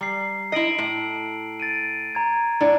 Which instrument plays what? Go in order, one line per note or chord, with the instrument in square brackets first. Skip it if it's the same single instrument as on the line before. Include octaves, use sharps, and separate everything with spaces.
[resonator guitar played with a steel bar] G3 [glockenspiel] A#5 C7
[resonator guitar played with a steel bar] E4 D#5 [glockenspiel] C7 D7 F#7
[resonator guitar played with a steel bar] A2 [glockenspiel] B6
[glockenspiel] A6 D7 D#7
A#5 G#6
[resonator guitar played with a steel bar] A2 [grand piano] D4 D5